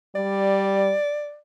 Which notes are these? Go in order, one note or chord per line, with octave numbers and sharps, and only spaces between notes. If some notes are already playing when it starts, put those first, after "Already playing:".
G3 D5